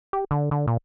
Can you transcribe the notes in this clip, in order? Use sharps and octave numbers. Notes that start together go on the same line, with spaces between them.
G4
D3
D3
A#2